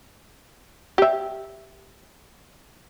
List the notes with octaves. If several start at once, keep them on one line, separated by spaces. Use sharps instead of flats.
G4 E5